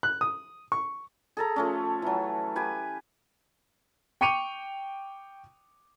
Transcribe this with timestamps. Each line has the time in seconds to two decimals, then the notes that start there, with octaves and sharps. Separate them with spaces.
0.03 F#6
0.21 D#6
0.72 C#6
1.37 G#4 A4 A#5
1.56 F3 A3 C#4
2.02 E3 F#3
2.56 G4 B4 G#5
4.21 G5 C#6 D6 C#7 D#7 F7